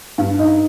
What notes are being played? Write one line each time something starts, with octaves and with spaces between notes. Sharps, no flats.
G2
D#4